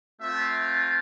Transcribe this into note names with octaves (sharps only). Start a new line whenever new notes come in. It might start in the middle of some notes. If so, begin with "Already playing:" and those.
A3 C4 F4 E5